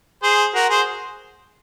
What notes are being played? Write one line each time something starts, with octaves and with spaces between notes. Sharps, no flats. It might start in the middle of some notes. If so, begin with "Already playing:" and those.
G#4 C5
F#4 A#4
G#4 C5